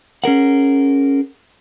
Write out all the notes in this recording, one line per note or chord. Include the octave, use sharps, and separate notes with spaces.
C#4 G#4 A#4 F#5